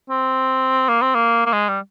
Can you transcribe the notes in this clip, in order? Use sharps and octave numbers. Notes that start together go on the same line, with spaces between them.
C4
A#3
C4
A#3
A#3
G#3
G3